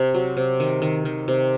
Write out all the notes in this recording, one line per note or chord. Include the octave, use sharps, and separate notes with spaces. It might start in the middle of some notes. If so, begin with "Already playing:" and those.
Already playing: C3
F#3
C3
D#3
D#3
D#3
C3